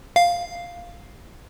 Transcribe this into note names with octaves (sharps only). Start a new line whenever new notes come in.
F5